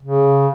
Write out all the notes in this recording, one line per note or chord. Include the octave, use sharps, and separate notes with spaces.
C#3